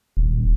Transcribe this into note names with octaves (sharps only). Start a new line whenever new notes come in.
D#1